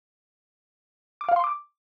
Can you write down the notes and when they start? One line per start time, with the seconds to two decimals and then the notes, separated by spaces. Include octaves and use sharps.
1.21 D6
1.29 F5
1.36 C6
1.44 D6